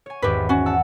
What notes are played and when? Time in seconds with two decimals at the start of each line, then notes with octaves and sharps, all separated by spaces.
0.06 C#5 G#5
0.22 G#1 E2 G#2 G4 B4
0.49 C#4 F#4
0.66 F#5 A5 E6